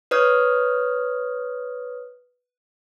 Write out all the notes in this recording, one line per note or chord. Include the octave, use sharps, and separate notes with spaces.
B4 C#5 D#6 F6 G#6